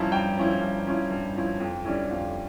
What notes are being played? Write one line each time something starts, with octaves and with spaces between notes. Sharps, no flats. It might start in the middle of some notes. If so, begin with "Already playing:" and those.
Already playing: G2 F3 C#4 E4 A5 A#5
G2 G5
F3 C#4 E4
G2
F3 C#4 E4
G2
F3 C#4 E4
F2
D3 G3 C#4 E4
F2 F5